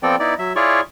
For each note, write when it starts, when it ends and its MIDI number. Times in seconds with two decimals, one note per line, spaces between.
0.03 0.16 53
0.03 0.16 59
0.03 0.16 60
0.03 0.16 69
0.03 0.16 74
0.03 0.16 79
0.19 0.34 59
0.19 0.34 63
0.19 0.34 64
0.19 0.34 74
0.39 0.53 54
0.39 0.53 76
0.56 0.81 64
0.56 0.81 65
0.56 0.81 68
0.56 0.81 73
0.56 0.81 74
0.56 0.81 85